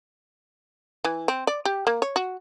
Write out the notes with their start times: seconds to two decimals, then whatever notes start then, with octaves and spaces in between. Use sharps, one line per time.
1.04 E3
1.28 C4
1.47 D5
1.65 G4
1.87 A#3
2.02 C#5
2.16 F#4